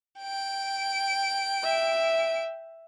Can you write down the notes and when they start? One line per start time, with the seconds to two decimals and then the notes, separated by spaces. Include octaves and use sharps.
0.21 G5 D7
1.64 E5